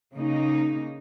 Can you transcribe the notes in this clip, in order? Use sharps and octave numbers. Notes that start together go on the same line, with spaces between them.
C#3 A#3 D#4